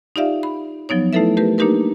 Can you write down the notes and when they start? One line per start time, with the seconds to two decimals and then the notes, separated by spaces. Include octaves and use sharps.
0.16 D#4 F4 G4 D5 E5 F5
0.43 B5
0.89 F3 F#3 B3 D#4 C#5
1.13 A3 D#4 E4 A4 B4 E5
1.37 A3 G4 A#4 B4
1.58 A#3 D4 D#4 G4 A#4 B4